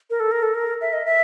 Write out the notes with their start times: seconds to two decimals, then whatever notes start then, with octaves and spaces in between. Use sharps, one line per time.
0.10 A#4
0.20 A4
0.31 A#4
0.43 A4
0.54 A#4
0.81 E5
0.93 D#5
1.05 E5